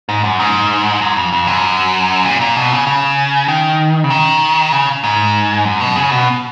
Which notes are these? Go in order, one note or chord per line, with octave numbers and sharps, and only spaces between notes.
G#2
F#2
G#2
F#2
F2
F2
F#2
A#2
A#2
B2
C#3
C#3
D#3
C#3
D#3
C#3
G#2
F#2
B2
C#3
B2